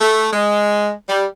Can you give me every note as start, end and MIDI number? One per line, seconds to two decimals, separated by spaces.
0.01 0.28 57
0.33 0.90 56
1.09 1.24 55